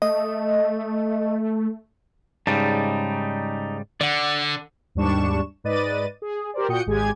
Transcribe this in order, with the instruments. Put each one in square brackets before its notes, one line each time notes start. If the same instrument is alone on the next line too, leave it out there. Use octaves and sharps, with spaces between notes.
[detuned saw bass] A3 [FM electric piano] D#5
[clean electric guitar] G#2 C#3 G3 [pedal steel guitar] D#4 D5 A5
[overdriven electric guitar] D3 [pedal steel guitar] D5 F#5
[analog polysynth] D#2 G#2 G3 D4 C#6 E7
G#2 B4 D5 D#5 A6 D#7
G#4
G4 A#4 C5 D5
A#2 F#4 G5 D#6 G6 C#7
G#1 G#3 G4 G#4 G#5 G#6